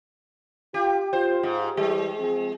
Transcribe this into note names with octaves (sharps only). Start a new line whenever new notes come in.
F4 G4
F4 C5
G#2
E3 G3 G#3 G4
F3 C4 G#4